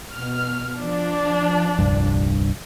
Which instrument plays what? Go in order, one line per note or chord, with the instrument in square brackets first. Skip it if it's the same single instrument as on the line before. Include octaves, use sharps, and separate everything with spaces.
[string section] B2 F6
F3 D4
[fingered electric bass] D#1 C2 G2